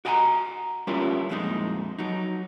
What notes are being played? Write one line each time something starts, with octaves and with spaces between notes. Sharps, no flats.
F#4 D5 D#5 G5 G#5 A#5
G3 B3 C#4 E4 F4 A#4
F2 A#2 G#3 C4 D#4
F#3 D#4